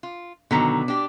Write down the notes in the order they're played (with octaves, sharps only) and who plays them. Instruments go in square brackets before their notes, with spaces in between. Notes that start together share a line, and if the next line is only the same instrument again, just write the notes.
[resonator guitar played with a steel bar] F4
[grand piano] B2 B3 B6 [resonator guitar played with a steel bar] D3 D#3 F#3
[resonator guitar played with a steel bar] D4 G4